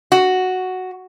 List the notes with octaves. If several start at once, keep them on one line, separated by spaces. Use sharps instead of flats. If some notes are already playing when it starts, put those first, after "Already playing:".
F#4